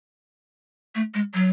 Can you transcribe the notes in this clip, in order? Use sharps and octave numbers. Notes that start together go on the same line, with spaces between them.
A3
G#3
F#3